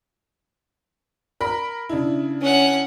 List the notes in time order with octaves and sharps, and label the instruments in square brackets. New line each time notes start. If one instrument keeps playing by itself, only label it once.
[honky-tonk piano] A#4 B5
C#3 D4 E4
[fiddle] C#4 F#5